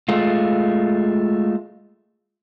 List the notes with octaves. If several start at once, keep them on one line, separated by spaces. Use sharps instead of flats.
G#3 A3 F4